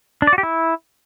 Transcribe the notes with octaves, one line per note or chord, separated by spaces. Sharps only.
D4
D5
F#4
G4
E4